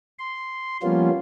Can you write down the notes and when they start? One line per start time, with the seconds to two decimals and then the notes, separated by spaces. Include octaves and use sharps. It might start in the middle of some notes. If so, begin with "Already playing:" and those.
0.19 C6
0.83 F3 G3 A#3 B3 C#4 F4